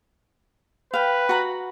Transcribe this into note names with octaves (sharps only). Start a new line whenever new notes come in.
B4 F5 G5
F#4 A#5 B5